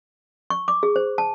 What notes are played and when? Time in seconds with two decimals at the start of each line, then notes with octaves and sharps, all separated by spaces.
0.50 C#6
0.68 D6
0.83 G#4
0.96 C5
1.18 A5